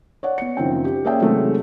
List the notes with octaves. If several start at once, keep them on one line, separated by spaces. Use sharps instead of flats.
C#5 D5 F#5
B3 C#7
F#1 D#3 F3 C4 G5
G4
A#3 C#4 G#4 D5 E5 G5
C3 D#3 F#3 G#3 A3 C4